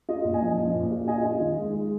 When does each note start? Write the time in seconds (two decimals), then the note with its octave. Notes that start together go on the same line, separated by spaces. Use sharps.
0.09 F4 D#5
0.25 A#2
0.34 D#5 G#5
0.42 F3
0.58 F3
0.75 A#2
0.91 F4
1.08 F4 D#5 G#5
1.25 F4
1.41 D#3
1.57 G#3
1.75 G#3